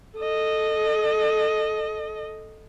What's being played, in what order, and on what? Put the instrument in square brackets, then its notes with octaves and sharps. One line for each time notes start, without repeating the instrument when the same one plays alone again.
[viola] A4 D#5